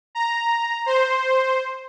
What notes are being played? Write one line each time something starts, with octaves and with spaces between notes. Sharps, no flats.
A#5
C5